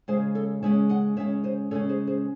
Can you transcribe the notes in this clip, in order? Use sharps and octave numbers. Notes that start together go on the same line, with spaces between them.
C#3 G#3 C#4 G#4 C5
A4 C#5
C#3 G#3 C#4 C#5 E5
D#5 F#5
C#3 G#3 C#4 C#5 E5
C5 D#5
C#3 G#3 C#4 A4 C#5
G#4 C5
G#4 C5